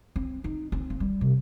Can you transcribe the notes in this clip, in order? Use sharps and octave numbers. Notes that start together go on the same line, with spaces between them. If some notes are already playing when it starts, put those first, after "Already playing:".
C4
D#4
C4
A#3
G3
C3